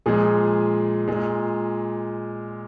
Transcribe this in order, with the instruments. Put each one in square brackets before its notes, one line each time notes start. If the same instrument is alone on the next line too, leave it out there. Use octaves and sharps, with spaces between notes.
[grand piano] A#2 F3 G#3 G#4
A#2 G#3